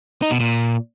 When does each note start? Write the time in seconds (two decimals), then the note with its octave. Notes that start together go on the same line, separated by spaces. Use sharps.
0.22 D#4
0.31 B2
0.40 A#2